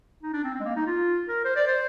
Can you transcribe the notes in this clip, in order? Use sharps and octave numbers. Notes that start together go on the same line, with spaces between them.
D#4
D4
C4
C4
G#3
A#3
D#4
F4
A#4
C5
D5
C5